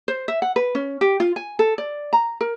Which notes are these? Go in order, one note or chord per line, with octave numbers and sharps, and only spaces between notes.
C5
E5
F#5
B4
C#4
G4
F4
G#5
A4
D5
A#5
A#4